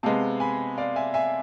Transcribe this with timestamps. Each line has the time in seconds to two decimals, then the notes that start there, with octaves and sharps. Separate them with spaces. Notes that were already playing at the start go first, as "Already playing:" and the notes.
0.03 C3 G#3 B3 F5 A5
0.40 G#5 B5
0.78 D5 F5
0.96 E5 G#5
1.14 E5 G#5